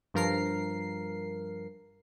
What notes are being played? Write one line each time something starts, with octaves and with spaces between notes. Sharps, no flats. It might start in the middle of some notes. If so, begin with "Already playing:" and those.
G2 F3 A#4 C7